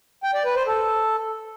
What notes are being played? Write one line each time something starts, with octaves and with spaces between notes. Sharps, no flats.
G5
D5
B4
C5
A4